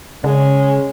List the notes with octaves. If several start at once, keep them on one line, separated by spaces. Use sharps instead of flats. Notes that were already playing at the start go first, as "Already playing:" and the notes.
C#3 G#3 C#4